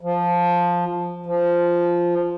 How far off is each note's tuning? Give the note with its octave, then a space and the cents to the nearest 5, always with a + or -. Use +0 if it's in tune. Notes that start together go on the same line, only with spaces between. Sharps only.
F3 +5
F3 -5